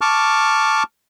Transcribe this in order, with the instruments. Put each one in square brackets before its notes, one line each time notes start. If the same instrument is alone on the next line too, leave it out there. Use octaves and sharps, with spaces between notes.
[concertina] A5 C#6 D6 F6